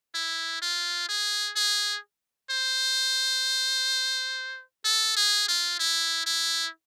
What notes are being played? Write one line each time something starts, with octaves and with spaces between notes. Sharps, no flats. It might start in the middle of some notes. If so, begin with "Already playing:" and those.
E4
F4
G#4
G#4
C5
A4
G#4
F4
E4
E4